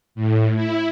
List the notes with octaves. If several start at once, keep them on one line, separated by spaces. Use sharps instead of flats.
A2
E4